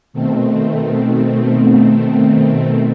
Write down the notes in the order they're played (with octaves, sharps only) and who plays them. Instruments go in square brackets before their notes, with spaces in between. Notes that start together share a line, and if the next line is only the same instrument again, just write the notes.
[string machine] B2 D#3 A3 C4